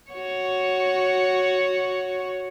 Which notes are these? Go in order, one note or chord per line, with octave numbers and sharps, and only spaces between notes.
F#4 C#5